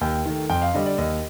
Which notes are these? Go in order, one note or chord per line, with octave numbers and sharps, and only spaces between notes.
D#2 G5
D#3 A3
F2 G5
F5
D3 G3 D#5
D5
D#2 D#5